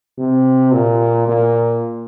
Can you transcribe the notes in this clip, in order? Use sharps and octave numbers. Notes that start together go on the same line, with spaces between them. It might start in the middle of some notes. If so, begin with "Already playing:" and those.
C3
A#2
A#2